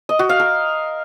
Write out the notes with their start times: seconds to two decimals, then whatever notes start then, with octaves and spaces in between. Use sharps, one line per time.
0.09 D#5
0.19 F#4
0.29 F5
0.40 A#4